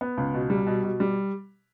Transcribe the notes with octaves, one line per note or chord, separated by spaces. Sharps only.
B3
C#2
B2
G3
B2
B2
G3